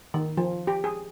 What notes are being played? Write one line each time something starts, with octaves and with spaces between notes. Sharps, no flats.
D#3
F3
G4
G#4